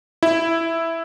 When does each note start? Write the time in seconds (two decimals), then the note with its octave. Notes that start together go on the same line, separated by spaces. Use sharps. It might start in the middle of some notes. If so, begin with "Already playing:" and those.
0.23 E4